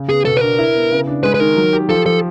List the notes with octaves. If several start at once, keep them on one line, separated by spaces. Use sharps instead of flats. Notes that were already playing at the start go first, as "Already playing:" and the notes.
Already playing: C#3
B3 G#4
B2 A4
B4
D4 A#4
E4
B3
C#3
D4
G#3 B4
B4
D#3 A#4
F#3
G4
F3 A4
F3 A4